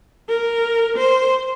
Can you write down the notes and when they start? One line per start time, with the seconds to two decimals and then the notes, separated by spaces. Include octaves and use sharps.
0.29 A#4
0.97 C5